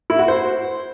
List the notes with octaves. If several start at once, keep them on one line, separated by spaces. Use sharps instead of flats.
E4
F#4
C5